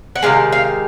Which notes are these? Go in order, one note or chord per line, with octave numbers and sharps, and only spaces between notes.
F#5
C3 D#3 G#3 F5
F5